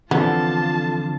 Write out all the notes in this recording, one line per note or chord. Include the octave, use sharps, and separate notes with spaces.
D3 E3 F3 B3 C4 F4 A4 A5